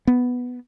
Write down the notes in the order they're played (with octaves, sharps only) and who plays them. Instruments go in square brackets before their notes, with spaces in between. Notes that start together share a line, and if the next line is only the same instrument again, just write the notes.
[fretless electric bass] B3